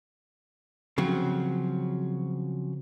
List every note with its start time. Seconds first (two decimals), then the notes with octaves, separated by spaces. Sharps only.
0.98 C#3 F3 F#3 C4